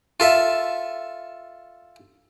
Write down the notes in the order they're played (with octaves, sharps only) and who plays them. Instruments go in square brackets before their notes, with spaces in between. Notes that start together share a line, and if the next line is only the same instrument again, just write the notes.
[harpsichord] F4 A4 E5